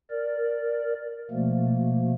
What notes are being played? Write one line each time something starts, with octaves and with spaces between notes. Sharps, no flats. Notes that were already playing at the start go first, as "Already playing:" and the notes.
A#4 D5
B2 F3 A3 A#3